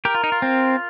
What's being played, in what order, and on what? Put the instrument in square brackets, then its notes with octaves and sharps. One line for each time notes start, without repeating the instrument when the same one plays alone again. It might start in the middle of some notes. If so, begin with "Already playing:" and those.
[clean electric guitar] G4 [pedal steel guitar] A#4
[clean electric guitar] F4
D#4
F4
[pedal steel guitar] C4